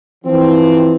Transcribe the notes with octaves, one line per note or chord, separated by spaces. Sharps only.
E3 F3 C4